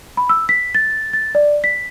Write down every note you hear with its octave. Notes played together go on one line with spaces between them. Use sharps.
B5
E6
B6
A6
A6
D5
B6